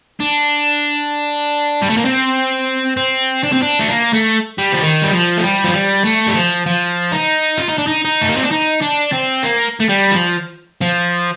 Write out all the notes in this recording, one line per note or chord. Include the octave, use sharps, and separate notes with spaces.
D4
G3
A3
A#3
C4
C4
D4
C4
D4
A3
A#3
A3
G3
F3
D#3
G3
F3
A3
G3
F3
G3
A3
G3
F3
F3
D#4
F4
D#4
D4
D#4
D#4
A3
A#3
C4
D4
D#4
D4
C4
A#3
A3
G3
F3
F3